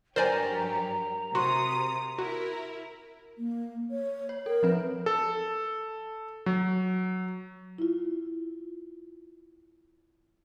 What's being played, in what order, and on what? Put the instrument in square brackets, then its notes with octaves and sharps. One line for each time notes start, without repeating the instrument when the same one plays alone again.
[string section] G2 F#3 G4 [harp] A#4 [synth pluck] C5 D5 G#5 [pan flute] A#5
[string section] C3 D#6 [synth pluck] F#4 [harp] C6
[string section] E4 A#4 [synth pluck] F#4
[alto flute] A#3
C#5
[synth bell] C#5
[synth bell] A4 [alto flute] A#4
[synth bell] F3 C4 B4
[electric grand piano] A4
F#3
[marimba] E4 F4